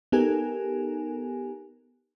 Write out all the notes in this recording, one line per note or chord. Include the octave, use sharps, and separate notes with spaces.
B3 D#4 G4 A4 A#4 G#5